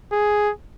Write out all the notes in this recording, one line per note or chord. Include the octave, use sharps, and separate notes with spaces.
G#4